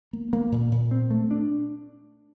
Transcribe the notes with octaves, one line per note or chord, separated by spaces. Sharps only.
A#3
A#3
A#2
A#2
C4
A3
D4